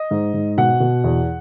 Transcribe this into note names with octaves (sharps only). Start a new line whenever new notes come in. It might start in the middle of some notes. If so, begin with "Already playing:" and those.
Already playing: D#5
G#2
G#2
B2 F#5
B2
E2